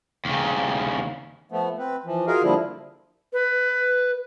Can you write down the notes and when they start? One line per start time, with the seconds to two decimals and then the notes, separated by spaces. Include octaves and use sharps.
0.25 D#2 C#3
1.52 F3 A3 B3
1.78 C4 B4
2.06 E3 F3
2.27 F4 F#4 G#4 A#4 D#5 F5
2.43 A#2 D3 F3 G3 E4
3.33 B4